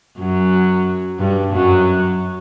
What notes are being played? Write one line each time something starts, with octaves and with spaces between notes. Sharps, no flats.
F#2 F#3
G2 G3
F#2 F#3